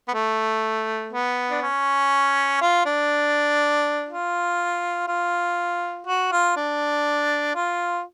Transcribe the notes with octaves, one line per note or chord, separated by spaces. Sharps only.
B3
A3
B3
D4
C#4
F4
D4
F4
F4
F#4
F4
D4
F4